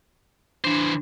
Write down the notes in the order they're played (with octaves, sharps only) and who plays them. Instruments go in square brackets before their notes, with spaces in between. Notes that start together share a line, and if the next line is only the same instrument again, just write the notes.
[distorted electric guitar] E3 C5 [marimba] D4